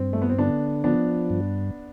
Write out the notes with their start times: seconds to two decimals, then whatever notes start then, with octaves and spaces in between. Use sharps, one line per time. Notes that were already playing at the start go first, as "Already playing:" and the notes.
Already playing: G2 C4
0.13 A3
0.22 B3
0.30 C4
0.38 D3 B3 D4
0.84 F3 B3 D4
1.30 G2